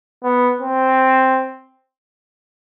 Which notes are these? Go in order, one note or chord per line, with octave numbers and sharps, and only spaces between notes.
B3
C4